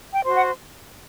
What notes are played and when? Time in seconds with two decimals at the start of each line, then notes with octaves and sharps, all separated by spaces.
0.14 G5
0.25 F#4 C5
0.35 F#5